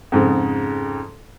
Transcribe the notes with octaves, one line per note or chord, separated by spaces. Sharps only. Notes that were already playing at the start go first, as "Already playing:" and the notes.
F2 G#2 C#3